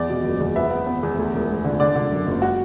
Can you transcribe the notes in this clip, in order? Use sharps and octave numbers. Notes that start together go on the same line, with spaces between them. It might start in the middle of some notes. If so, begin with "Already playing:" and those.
Already playing: E2 D5
B2
F#1
E2
B3 E5
B3
B3
E2
D2
E1
A3
D3
D3 D5
D3
F#2
F#1
F#4